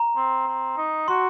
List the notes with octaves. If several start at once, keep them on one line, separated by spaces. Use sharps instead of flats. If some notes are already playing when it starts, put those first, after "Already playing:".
Already playing: A#5
C4
C4
D#4
F#4 C6